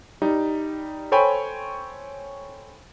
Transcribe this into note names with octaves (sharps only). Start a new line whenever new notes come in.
G3 D#4
A4 C5 C#5 G5 G#5 B5